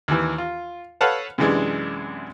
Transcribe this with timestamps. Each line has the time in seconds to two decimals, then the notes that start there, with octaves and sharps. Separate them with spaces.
0.08 D#2 E3
0.38 F4
1.01 A4 B4 C#5 F5 F#5 A5
1.38 F#2 C3 E3 G#3 D4